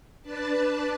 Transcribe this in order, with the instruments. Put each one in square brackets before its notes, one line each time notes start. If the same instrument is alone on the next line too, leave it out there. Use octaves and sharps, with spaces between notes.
[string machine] D4 B4 D5 A5